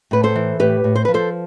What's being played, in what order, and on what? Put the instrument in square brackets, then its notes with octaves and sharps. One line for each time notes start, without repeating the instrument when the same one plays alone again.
[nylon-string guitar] A2 B4
A4 C5
E3
A2 G4 B4
A2
C5
F3 B4
A4 C5